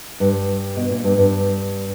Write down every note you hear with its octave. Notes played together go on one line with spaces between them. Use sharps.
G2
B2
A#2
G2
G2